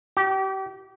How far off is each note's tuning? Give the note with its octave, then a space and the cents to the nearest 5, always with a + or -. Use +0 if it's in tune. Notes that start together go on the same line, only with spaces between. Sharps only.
G4 -30